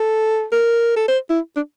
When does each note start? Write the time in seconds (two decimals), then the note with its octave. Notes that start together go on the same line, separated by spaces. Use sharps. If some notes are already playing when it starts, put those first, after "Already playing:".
Already playing: A4
0.52 A#4
0.96 A4
1.08 C5
1.30 E4
1.56 D4